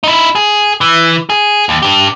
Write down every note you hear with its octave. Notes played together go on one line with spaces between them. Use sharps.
D#4 E4
G#4
E3
G#4
D#2
D4 G4